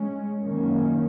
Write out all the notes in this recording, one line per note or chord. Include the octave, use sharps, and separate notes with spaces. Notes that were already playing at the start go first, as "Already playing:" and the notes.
Already playing: G#3 C#4
F#2 D#3 A#3 C#4